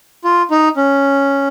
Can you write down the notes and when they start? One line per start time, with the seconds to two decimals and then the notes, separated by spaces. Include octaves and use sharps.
0.24 F4
0.51 D#4
0.76 C#4